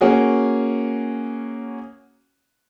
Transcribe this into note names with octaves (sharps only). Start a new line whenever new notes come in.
A#3 C#4 F#4 G#4